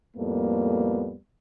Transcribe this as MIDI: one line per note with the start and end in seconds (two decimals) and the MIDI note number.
0.17 1.15 41
0.17 1.15 45
0.17 1.15 55
0.17 1.15 58
0.17 1.15 59